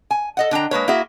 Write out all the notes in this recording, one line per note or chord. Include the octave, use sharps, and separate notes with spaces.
G#5
A4 D#5 F#5
D3 D4 G5 A#5
G#3 A#3 B4 C#5
A#3 E4 F#4 G#4 E5